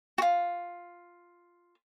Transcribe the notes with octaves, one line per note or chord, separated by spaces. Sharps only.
F4 F#4